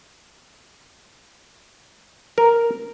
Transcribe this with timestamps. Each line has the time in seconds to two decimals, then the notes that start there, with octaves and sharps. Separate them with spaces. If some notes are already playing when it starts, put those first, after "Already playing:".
2.38 A#4